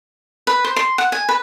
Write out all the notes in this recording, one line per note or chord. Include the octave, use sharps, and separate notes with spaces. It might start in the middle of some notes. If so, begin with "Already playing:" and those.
B4
C5
C6
F#5
G#5
B4